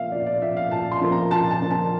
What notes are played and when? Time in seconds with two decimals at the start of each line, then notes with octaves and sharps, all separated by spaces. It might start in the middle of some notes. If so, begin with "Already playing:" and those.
Already playing: A#2 F3 A#3 E5 F5
0.12 A#2 D5
0.26 D5
0.42 F3 A#3 E5
0.57 F5
0.71 A#2 A5
0.92 C6
1.01 F3 A#3
1.12 A#5
1.31 A#2 A5
1.50 A5
1.61 F3 A#3
1.71 A5